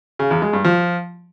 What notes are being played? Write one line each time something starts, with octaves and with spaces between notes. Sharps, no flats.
C#3
E2
G#3
G2
F3